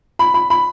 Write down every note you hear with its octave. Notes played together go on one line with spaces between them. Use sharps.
B5
B5
B5